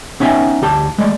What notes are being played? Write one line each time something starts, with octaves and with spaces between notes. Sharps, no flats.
B3 C#4 D#4 E5 G5 G#5
D2 G4 A5
G#3 A3 D5